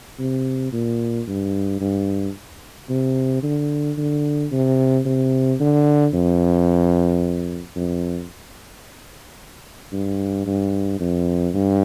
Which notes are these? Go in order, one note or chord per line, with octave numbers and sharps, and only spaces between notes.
C3
A#2
G2
G2
C3
D3
D3
C3
C3
D3
F2
F2
G2
G2
F2
G2